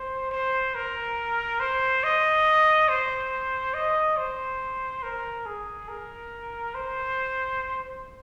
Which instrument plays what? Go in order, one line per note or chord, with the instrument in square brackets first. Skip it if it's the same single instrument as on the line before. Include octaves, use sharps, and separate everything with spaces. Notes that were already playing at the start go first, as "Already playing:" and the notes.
Already playing: [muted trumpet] C5
C5
A#4
C5
D#5
C5
D#5
C5
A#4
G#4
A#4
C5